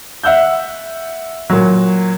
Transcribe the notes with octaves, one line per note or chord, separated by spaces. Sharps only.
E5 F#5 E6 G6
A#2 F#3